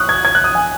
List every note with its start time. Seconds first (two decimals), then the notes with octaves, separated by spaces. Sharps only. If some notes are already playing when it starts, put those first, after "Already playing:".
Already playing: C#6 D#6 F#6
0.09 G#6
0.25 G#6
0.35 F#6
0.44 D#6
0.55 G#5